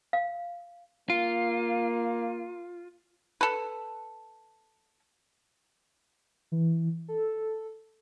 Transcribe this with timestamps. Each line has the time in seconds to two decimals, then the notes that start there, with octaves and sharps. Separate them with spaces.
0.13 F5
1.10 A#3 F4
3.41 A4 B4
6.52 E3
7.08 A4